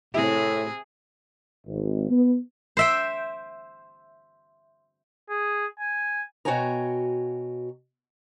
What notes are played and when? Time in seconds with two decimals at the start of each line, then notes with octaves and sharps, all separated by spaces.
0.14 A2 C3 E4 G#4
1.66 G#1
2.10 B3
2.77 C5 E5 G5
5.30 G#4
5.79 G#5
6.45 B2 F#4 C#5 G5 G#5 A#5